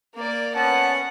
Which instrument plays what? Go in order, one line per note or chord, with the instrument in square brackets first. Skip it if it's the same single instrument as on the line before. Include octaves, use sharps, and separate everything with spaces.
[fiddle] A#3 D5
[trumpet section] B3 C#4 A5 [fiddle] F#5